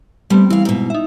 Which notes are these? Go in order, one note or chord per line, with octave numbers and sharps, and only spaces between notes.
G3 A3 B3 C4
E3 E4 F5
G#2 B2
D#4 E5